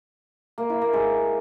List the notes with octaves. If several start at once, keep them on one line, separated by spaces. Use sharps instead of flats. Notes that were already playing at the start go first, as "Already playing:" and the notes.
A#3
E4
A#3
G#3